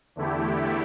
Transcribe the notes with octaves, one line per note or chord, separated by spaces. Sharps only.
E2 D3 A3 E4 G4